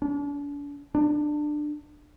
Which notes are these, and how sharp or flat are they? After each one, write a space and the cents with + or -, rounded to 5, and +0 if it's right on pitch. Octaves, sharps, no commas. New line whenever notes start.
D4 -40
D4 +20